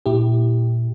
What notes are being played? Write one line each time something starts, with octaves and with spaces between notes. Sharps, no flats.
A#2 E4 G4